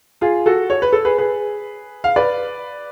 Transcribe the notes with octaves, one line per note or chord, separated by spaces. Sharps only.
F4 G#4
F#4 A4
C#5
B4
A4
G#4 B4
G#4 B4
F5
B4 D5